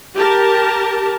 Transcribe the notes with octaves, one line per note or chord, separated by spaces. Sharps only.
G4 A#4 A5